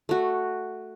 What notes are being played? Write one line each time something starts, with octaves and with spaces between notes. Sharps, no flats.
A3 F#4